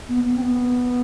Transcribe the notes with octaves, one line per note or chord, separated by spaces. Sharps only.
B3
B3
C4
B3